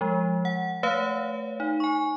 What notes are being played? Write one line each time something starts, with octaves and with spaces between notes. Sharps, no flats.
F3 G#3
F#5
A3 B4 C#5 F5 F#5
D#4
G#5 C#6